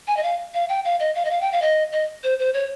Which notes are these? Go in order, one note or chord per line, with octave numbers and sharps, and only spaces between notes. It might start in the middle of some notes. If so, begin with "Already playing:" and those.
G#5
D#5
F5
F5
G5
F5
D#5
F5
D#5
F5
G5
F5
D#5
D#5
C5
C5
C#5